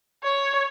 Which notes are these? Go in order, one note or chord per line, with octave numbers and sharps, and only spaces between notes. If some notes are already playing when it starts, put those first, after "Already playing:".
C#5